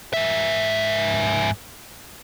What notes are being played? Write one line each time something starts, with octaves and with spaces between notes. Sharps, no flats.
G#2 E5